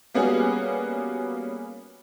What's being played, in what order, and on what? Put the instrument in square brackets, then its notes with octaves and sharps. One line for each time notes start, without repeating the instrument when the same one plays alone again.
[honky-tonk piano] G3 A#3 B3 C#4 F#4 G#4